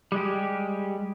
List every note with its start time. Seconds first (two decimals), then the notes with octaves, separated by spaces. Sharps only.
0.12 G3 G#3 G4